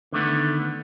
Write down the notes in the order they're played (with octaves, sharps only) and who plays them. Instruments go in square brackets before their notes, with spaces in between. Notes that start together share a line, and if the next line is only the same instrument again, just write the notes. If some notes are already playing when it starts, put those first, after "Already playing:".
[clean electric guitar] D3 D#3 A3 B3